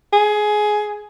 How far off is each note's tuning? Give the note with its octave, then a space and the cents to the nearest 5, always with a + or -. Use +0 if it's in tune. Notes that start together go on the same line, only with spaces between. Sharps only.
G#4 +15